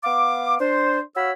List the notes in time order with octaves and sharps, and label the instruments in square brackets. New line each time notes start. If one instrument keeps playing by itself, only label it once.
[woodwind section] B3 F5 D6
D4 C5
F#4 C#5 F5 B5 E6